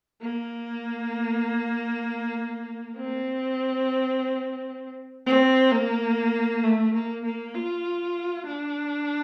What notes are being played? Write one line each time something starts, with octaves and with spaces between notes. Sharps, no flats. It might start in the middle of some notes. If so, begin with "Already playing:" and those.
A#3
C4
C4
A#3
A3
A#3
A#3
F4
D4